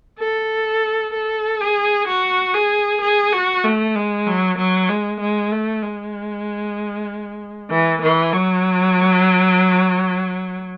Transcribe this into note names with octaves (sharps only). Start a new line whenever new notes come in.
A4
A4
G#4
F#4
G#4
G#4
F#4
A3
G#3
F#3
F#3
G#3
G#3
A3
G#3
E3
E3
F#3